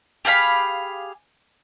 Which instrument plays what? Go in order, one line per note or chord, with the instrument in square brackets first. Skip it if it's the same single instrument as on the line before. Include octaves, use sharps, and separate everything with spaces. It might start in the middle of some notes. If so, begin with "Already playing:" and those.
[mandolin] G4 G#4 F5 B5